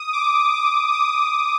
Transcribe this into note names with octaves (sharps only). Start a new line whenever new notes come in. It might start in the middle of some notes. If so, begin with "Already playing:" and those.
Already playing: D#6
D6
D6
D#6